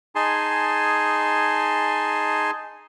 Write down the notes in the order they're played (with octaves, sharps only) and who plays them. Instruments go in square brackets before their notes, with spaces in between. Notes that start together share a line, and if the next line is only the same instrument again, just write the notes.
[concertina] D#4 G#4 G#5 A5 C6